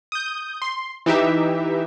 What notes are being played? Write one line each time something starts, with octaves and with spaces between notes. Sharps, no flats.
D#6 G6
C6
E3 D#4 G4 E5